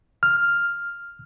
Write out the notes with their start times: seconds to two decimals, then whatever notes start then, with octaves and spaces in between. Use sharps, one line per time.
0.23 F6